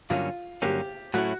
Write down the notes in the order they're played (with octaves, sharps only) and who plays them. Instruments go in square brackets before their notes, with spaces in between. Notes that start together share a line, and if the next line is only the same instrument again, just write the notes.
[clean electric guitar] G2 D3 F#3 A#3 C#4 [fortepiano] F4
[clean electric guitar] G2 D3 F#3 A#3 C#4 [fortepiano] G4
[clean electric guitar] A2 F#3 A3 C#4 E4 [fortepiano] F#4